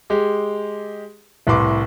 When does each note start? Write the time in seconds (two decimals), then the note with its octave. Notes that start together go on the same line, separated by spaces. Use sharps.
0.10 G#3 G4 G#4
1.47 C2 A2 B4 C6 D6